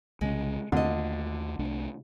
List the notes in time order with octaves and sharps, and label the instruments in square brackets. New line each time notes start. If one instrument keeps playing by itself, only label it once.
[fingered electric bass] C2 C#3 C#4 [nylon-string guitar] G#3
[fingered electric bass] D#2 A3 [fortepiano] D3 [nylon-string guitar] F4 D#5
[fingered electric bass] C2 A3 D4